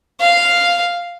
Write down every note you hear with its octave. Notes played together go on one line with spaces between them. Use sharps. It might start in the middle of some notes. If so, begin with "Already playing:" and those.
F5